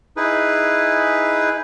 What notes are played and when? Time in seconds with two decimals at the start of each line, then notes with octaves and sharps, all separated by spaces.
0.17 D#4 E4 G#4 B4